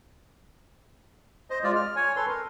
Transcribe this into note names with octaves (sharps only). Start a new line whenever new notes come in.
C5 D#5
G#3 F4 D5
F6
C#5 G#5
A4 B4 C6
A#4